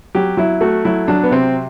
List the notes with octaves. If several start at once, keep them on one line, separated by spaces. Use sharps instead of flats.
F#3 G4
F#3 E4
A3 F#4
F#3 E4
F#3 D4
B3
C3 C4